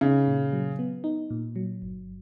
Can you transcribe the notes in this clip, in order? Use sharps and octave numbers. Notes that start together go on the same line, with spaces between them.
C#3 D#4
A#2
F#3
B3
D#4
A#2
F#3
G1